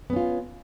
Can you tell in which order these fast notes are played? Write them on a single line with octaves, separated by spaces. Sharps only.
B3 C#4 F4